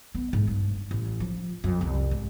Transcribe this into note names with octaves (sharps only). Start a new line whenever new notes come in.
B3
G#2
G2
A1
F3
F2
C2
G#2